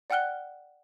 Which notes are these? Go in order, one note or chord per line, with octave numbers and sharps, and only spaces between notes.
D5 F#5 G5 F6 F#6 G7